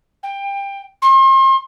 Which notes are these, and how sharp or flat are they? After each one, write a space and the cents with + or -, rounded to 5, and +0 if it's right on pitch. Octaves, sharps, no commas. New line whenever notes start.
G5 +20
C6 +40